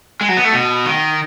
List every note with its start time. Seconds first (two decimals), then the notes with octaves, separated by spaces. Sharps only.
0.21 G#3
0.29 F#3
0.37 B3
0.45 A3
0.53 B2
0.86 D#3